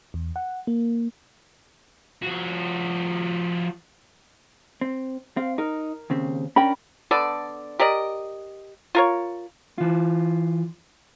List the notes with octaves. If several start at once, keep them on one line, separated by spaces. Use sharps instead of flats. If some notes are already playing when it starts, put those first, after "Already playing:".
E2
F#5
A#3
F3 F#4
C4
C4 F5
D#4 A#4
D#2 C#3 C4
C#4 D4 A#4 G5 B5
D3 B3 A4 D5
G4 A#4 D5 D#5
F4 A#4 C#5
E3 F4